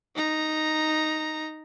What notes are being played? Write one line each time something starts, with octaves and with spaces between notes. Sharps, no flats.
D#4 A#5